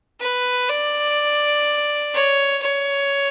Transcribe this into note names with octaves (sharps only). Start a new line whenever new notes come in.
B4
D5
C#5
C#5